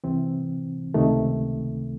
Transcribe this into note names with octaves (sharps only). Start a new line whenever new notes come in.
C2 C3 E3 C4
C#2 C3 D#3 A3